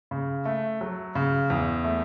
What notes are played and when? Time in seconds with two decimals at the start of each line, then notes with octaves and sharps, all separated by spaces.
0.11 C#3
0.45 A3
0.81 F#3
1.15 C#3
1.50 E2
1.84 A3